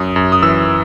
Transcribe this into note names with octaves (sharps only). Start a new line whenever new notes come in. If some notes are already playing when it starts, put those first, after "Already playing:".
Already playing: F#2 D#6
F#2
D#6
E3 E6